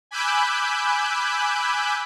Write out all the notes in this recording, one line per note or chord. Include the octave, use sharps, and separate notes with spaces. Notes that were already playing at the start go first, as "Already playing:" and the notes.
G#5 B5 D6 E6 F#6 G6